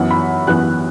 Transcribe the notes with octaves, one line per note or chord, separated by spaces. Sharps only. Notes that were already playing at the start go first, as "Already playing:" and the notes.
Already playing: F#2 E3 B3 F#5
B5
F#2 E3 B3 F#6